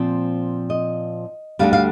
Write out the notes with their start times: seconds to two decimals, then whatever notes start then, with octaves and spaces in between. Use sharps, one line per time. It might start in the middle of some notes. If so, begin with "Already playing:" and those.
Already playing: A#2 F3 C4
0.70 D#5
1.59 D2 D3 G3 F5
1.73 F5